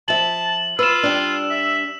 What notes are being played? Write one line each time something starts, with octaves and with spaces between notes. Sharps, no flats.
F3 E5 A5 F#7
F4 B4 E6 E7
G3 D4
E5